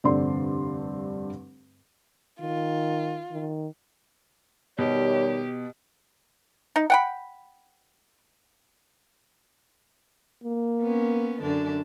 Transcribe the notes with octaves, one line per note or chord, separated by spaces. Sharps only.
F1 G2 D3 C4 D5 C6
D#3 F4
D#3
B2 D#3 G3 G4 C#5
D#4
F#5 G5 B5
A#3
B3 C#4
F#2 D3 D4